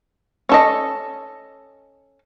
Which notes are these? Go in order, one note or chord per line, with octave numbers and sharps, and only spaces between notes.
C#4 A4 D#5